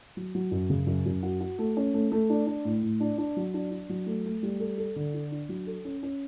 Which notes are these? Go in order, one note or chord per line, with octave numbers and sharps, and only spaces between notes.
F#3
F#3
F#2
C#3
F#2
F#2
F#4
F#4
A3
C#4
A3
A3
D4
D4
A2
A2
D4
D4
F#3
D4
D4
F#3
A3
A3
G3
A4
A4
D3
D4
D4
F#3
A4
C#4
C#4